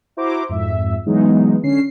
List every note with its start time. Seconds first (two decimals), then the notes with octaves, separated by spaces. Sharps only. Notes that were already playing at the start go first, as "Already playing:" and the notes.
0.17 E4 F#4 C5 A#5 D6
0.49 F2 G#2 E5
1.06 E3 F#3 G#3 B3 D#4
1.63 D3 C#4 C7